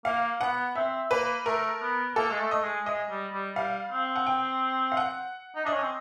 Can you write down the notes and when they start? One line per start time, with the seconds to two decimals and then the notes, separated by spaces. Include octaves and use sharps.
0.05 A#3 F5
0.41 B3 F#5
0.75 C4 E5
1.11 A#3 B4
1.46 A3 A#4
1.81 B3
2.16 A#3 A4
2.31 G#3
2.39 A3
2.51 A3 D#5
2.63 G#3
2.86 G#3 D#5
3.10 G3
3.33 G3
3.56 G3 F5
3.92 C4
4.16 F#5
4.27 G5
4.92 F5
4.97 F#5
5.56 D#4
5.65 D4 D#5
5.73 C#4
5.82 C4